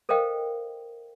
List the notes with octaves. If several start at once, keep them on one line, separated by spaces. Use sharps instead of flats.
A4 A#4 C5 D#5 F5 G5